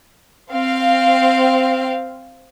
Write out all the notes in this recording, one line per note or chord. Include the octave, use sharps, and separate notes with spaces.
C4 F5